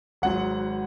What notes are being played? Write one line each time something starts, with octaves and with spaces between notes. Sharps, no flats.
G#1 G#2 F#3 F#5